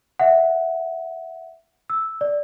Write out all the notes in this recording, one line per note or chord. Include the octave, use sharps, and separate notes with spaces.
E5 F#5
E6
D5